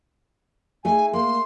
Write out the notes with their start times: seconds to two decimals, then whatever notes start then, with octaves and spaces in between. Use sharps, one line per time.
0.85 A3 D#4 G#4 G#5
1.13 A#3 C6